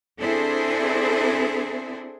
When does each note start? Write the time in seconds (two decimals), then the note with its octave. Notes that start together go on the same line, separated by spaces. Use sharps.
0.20 C4 D4 E4 G#4 A4